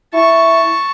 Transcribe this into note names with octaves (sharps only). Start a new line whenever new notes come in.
E4 A5 C#6